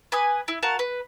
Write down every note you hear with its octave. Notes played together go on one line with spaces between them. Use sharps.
B4 G#5 D#6
E4
F#4 A#4 F5 A5
B4